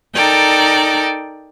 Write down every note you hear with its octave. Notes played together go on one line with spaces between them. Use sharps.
D#4 A4 A#4 D5 G5